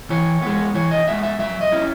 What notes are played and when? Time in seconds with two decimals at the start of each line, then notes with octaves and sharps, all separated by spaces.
0.10 E3 C#5
0.42 G#3 B3
0.74 E3 C#5
0.91 D#5
1.07 G#3 B3 E5
1.23 E5
1.39 F#3 E5
1.61 D#5
1.72 C#4 E4